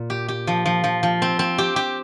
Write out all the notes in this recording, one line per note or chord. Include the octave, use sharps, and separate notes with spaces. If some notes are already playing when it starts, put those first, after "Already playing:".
Already playing: A#2
G4
G4
F3
F3
F3
F3
C4
C4
G4
G4